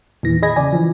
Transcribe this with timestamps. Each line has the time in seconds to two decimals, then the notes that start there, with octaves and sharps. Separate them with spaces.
0.23 E2 A#2 D#3 E3 A#6
0.42 G#4 D#5 B5 G#6 A#6
0.56 C#3 D5 G#5
0.72 E3 F3